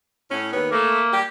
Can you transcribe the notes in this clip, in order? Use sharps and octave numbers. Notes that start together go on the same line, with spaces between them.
A2 C#4
D#2 B3 C#5
A3 A#3
G4